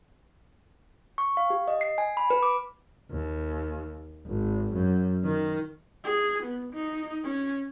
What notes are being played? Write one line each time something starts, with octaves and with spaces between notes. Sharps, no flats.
C#6
F5
G4
D#5
C7
G#5
B5
B4
D6
D#2
G#1
F#2
D#3
G#4
B3
D#4
C#4